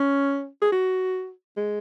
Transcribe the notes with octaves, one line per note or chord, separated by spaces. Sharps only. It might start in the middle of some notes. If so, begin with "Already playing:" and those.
Already playing: C#4
G#4
F#4
G#3